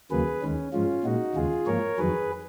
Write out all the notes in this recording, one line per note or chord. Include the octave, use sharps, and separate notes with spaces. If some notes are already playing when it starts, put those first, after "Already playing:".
D#2 C#3 F#3 A#3 G#4 B4
D#2 D#3 G#3 C#4
G#2 F3 G#3 C#4 F4
A#2 G#3 D#4 F#4
D#2 C#3 G#3 F4 G#4
G#2 F3 A#3 A#4 C#5
F2 D#3 F#3 G#4 B4